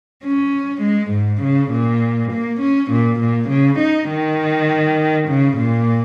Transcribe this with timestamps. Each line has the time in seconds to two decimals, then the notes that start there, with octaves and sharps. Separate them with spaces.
0.23 C#4
0.81 G#3
1.11 G#2
1.41 C#3
1.71 A#2
2.30 A#3
2.60 C#4
2.90 A#2
3.19 A#2
3.49 C#3
3.79 D#4
4.09 D#3
5.28 C#3
5.57 A#2